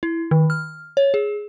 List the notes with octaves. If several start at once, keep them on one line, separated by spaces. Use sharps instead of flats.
E4
D#3
F6
C#5
G#4